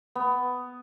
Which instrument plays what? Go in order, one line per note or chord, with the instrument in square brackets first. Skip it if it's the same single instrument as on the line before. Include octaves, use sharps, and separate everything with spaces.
[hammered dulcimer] B3